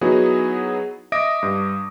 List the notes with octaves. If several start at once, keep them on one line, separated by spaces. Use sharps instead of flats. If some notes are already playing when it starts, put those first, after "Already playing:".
F#3 B3 D#4 E4 F#4 G#4
D#5 E5 D6 D#6 A#6 D7
G2